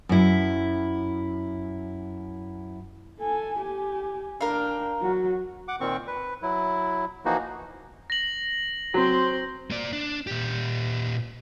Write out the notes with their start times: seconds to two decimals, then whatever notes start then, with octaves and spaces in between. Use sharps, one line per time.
0.09 F#2 E4
3.19 A4 G#5
3.59 G4 G#5
4.41 D4 A#4 F5 G5
5.01 F#3 F#4
5.68 F#5 D6
5.80 A#2 D#3 C4 C#6
6.07 B4
6.43 F#3 E4
7.25 E3 F3 A#3 D#4 F#4
8.10 A#6 F#7
8.94 F#3 C4 C5
9.70 A#3 D5
9.93 D4
10.27 A#2 G4